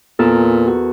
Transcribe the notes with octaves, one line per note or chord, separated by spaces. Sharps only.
E2 A#2 A4 A#4
F#4